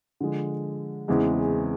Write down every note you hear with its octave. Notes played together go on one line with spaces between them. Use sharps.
D3 F3 G#3
E2 C#3 E3 G#3 C4